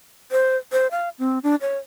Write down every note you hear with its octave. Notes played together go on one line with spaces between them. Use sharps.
C5
C5
F5
C4
D4
C#5